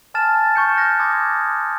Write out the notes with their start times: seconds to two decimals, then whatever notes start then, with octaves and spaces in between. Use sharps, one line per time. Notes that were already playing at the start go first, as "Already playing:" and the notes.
0.14 G#5 A5 F6 A6 E7
0.55 C#6 G6 C#7
0.77 F6 F#6 A#6
1.00 C6 D6 D#6 G#6 A6